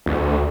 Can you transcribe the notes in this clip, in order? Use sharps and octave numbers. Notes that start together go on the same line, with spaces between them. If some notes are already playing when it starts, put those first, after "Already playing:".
D2